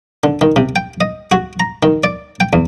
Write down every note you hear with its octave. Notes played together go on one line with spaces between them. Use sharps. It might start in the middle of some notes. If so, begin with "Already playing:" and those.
D3
D#3
C3
G5
D#5
F#4
A#5
D#3
D5
G5
E2